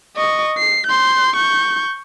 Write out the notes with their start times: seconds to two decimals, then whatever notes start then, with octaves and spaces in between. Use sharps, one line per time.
0.16 D#5 C#6
0.58 C7
0.87 C6 G6
1.36 C#6 G6